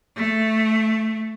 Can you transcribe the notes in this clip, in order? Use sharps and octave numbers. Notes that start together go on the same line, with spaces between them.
A3